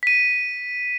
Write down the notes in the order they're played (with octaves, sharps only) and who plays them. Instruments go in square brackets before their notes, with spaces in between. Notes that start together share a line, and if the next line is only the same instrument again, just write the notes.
[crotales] B6 D#7